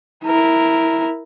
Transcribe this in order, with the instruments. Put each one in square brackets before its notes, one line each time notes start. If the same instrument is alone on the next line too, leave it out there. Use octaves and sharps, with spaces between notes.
[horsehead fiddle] E4 A#4